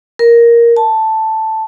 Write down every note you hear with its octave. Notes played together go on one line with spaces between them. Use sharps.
A#4
A5